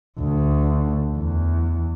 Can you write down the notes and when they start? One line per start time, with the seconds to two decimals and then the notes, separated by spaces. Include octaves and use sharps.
0.19 D2
1.17 E2